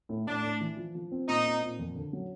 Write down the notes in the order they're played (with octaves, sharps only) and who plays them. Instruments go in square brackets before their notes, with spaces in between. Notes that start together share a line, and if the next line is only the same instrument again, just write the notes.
[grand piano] A2
[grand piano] A2 [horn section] D4
[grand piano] A2
E3
F3
F3
C4
[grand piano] A#2 [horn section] D#4
[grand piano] C4
A#2
F2
D3
F#3